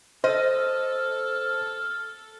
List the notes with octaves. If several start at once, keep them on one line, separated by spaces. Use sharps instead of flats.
A4 C5 D#5 F6